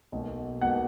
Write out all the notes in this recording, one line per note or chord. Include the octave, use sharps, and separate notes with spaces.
B1 B2 A#3
B1 B2 A#3 F#5